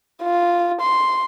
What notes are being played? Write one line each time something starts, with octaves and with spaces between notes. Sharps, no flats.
F4
C6